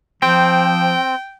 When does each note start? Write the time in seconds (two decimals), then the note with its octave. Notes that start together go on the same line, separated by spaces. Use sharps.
0.22 F3 C4 G5